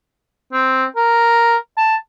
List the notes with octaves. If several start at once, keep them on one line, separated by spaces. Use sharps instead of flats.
C4
A#4
A5